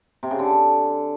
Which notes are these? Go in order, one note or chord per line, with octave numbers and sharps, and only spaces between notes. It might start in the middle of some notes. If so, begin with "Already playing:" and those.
C3
C#3
D3